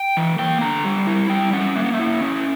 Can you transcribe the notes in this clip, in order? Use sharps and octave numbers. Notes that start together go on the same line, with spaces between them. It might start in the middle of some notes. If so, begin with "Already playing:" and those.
Already playing: G5
E3
A#3 G5
D3 A#5
G3
E4
G3 G5
C#4 F#5
A#3 E5
F#5
E5
E4
C#4